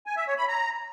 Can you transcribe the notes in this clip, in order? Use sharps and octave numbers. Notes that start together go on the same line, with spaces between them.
G#5
E5
C#5
B5
A#5